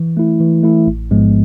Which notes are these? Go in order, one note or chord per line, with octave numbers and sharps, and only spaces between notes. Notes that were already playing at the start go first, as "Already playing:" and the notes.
Already playing: E3
A3 E4
E3
A3 E4
A1
G#2 F3 G#3 B3